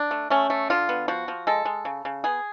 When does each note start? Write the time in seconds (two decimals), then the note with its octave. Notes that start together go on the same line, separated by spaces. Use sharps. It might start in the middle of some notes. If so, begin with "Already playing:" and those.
Already playing: D4
0.11 A3
0.30 A3 C#4
0.50 A3
0.70 D3 F4
0.89 B3
1.08 F3 F#4
1.28 F3
1.47 G#3 A4
1.65 G#3
1.85 C#3
2.05 C#3
2.24 B3 G#4